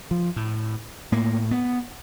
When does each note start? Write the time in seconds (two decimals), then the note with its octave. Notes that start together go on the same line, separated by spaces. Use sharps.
0.11 F3
0.36 A2
1.12 A2 A#3
1.51 B3